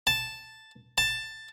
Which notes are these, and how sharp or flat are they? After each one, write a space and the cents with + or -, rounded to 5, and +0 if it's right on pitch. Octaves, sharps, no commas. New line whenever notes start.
A5 +0
A5 +10